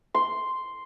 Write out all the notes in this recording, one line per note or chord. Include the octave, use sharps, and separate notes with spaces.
C6